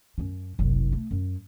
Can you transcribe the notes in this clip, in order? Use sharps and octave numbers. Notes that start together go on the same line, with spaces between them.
F#2 C#4
F#1 C2
A3
F#2